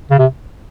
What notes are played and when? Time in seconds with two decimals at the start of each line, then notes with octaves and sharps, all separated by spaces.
0.11 C#3
0.19 C3